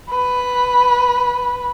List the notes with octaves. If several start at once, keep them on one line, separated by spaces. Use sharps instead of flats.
B4